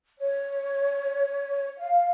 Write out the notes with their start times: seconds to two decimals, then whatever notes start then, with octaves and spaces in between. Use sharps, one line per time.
0.19 C#5
1.78 F5